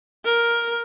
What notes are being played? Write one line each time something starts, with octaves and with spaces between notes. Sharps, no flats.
A#4